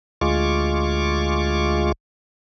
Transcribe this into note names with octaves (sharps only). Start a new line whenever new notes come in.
D2 G#3 F4 C#6 D6